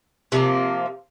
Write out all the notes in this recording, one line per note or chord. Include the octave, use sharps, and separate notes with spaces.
C3 F3 A#3